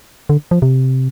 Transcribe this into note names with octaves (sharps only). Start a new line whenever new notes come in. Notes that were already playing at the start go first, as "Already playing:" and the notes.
D3
F3
C3